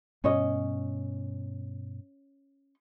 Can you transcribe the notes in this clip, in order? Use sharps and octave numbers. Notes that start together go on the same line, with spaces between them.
G2 B2 C#4 C#5 D#5